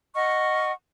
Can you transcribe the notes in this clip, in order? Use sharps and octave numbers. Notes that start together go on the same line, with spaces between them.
D#5 F#5 C#6 F6